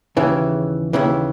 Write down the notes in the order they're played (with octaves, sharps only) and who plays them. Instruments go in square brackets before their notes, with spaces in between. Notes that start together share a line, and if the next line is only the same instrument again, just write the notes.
[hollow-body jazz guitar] D#2 C#3 E3
D#2 C#3 E3